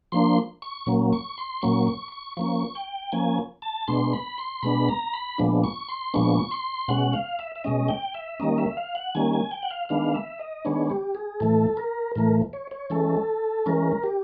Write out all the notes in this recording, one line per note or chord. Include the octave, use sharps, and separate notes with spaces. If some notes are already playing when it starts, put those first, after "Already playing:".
F3 A#3 D4 C6
C#6
A#2 F#3 A#3 C#4
C#6
C6
A#2 F#3 A#3 C#4 C#6
C#6
C#6
F3 A#3 C#4 C#6
G5
F3 A#3 C#4 G#5
A5
B2 G#3 B3 D4 C6
B5
C6
B2 G#3 B3 D4 B5
A#5
B5
A#2 F3 G#3 B3 D4
C#6
C6
A#2 F3 G#3 B3 D4 C#6
C6
B2 G#3 C#4 F#5
F5
E5
E5
B2 G#3 C#4 D#5
G5
E5
D#3 G3 A#3 C#4 D#5
E5
F5
F#5
D#3 G3 A#3 C#4 G#5
G#5
G5
F#5
F5
D#3 G#3 B3 D4 F5
E5
D#5
D#3 G#3 B3 D4 C#5
G4
G#4
A2 E3 A3 A4
A#4
A2 E3 A3 A#4
C#5
C#5
E3 G#3 C#4 A4
E3 G#3 C#4 A#4
G4